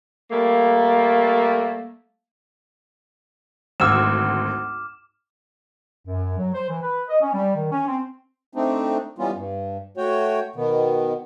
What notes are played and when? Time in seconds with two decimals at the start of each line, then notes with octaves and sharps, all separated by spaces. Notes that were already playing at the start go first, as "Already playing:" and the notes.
0.31 G3 A3 A#3
3.80 G#1 D2 D6 E6 F6 E7
6.06 F#2
6.38 F#3
6.54 C5
6.69 E3
6.83 B4
7.09 D#5
7.21 C#4
7.33 G3
7.55 D#3
7.72 C#4
7.88 C4
8.55 A3 C4 D4 D#4
9.18 E3 G3 B3 C#4 F4
9.35 G2
9.97 A3 F#4 C#5 G5
10.56 B2 D#3 B3